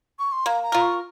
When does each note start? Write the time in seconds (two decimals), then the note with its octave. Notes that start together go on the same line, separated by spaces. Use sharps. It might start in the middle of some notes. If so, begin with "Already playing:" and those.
0.19 C#6
0.32 C6
0.46 A#3 A#5
0.63 A#5
0.72 F4 A#4
0.81 C#6